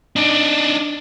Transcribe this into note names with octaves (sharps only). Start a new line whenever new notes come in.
D4 D#4